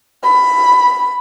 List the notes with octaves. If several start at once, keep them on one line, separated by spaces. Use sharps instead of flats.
B5